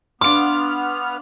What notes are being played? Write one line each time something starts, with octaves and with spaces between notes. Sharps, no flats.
B3 D4 F5 C6 D6 F6 D7